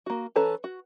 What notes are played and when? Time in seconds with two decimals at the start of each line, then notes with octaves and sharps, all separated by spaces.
0.06 A#3 F#4
0.36 E3 C#4 A4 B4 A#5
0.64 F#4